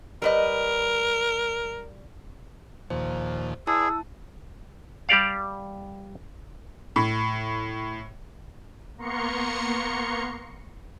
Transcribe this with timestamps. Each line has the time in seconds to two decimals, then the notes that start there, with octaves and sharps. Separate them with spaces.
0.22 G3 A#4 B4 D#5
2.90 D#2 A#2 F3 C5
3.67 E4 G#4 B4 D5 E5 A5 E6
5.09 G3 G4 D5 F5
6.96 A2
8.97 A#3 B3 A#5 C6 C#6 C#7